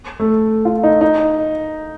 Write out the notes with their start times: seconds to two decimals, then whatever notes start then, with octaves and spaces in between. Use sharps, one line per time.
0.20 A3
0.65 F4
0.83 D#4
1.01 D#4